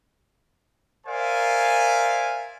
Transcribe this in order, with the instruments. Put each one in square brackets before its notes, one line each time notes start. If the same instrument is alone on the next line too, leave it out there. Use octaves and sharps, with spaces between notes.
[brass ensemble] A#4 C5 D5 E5 F5 G#5